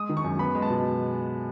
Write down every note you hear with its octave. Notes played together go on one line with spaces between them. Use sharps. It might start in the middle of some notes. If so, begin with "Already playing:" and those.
Already playing: G#3 D#6
D#3
C#6
F#2
B3 B5
G#3
A5
B2